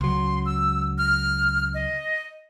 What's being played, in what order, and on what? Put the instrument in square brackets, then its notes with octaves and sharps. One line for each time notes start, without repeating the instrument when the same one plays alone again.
[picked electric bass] C#2 F#3 [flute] C6
[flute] E6
F6
D#5